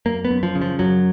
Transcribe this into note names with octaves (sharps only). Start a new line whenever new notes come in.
F#2 A#3
B3
F#2
F3
C#3
F3
F#2 F#3